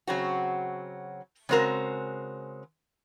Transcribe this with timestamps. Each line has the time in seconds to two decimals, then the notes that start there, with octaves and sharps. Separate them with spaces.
0.07 C#3 F#3 C4 F#4
1.49 C#3 G#3 C4 F#4 A#4